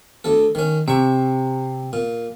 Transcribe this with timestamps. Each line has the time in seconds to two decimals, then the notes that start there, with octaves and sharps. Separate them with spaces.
0.24 D2 A4
0.55 D#3 C#4
0.88 C3 E5 C#6
1.93 A#2